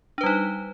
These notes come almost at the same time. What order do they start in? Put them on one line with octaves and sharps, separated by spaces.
D4 B4 G3 D#4